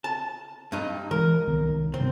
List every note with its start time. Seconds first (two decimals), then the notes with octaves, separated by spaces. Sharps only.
0.04 A5
0.72 G2 D#4
1.11 E3 G#3 A#4
1.47 C2 D#3 B3
1.94 G2 C3 C4